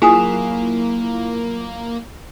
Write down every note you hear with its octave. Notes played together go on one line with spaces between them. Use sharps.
F#3 A#3 E4 F4 G#4 G#5 D#6